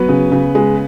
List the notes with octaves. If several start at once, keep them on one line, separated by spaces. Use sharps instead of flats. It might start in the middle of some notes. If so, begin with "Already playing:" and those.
Already playing: F#3 B3 B4
C#3
C#3
G#3